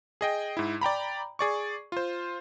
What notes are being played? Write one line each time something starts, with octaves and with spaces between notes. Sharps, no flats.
G#4 D#5 G5
G#2 E4
D5 G5 A#5 B5
G#4 D5 C#6
F4 C5